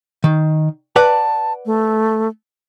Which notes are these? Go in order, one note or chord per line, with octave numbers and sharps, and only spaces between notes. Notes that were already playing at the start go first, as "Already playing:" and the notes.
D#3
B4 D5 F#5 A5
A3